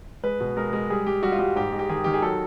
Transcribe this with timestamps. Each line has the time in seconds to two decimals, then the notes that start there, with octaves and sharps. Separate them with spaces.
0.23 G#3 B4
0.40 B2
0.57 G#3 A#4
0.73 G#3 A#4
0.90 G3 G#4
1.06 G3 G4
1.23 G3 F#4
1.32 F4
1.39 G3 F#4
1.56 G#2 G4
1.72 G#3
1.79 G4
1.89 D#3 G#4
2.04 D#3 G4
2.14 G#4
2.22 F#3 A4